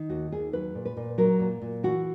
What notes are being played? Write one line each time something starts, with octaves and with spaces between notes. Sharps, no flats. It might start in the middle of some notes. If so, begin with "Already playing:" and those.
Already playing: D#3
D#2 F#4
D#2 G#4
F#3 B4
A#2
B4
A#2
F#3 A#4
A#2
A#2
E3 F#4